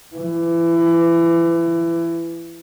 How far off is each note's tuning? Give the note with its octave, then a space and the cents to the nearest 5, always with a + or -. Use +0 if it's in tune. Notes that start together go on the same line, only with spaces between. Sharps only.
E3 +25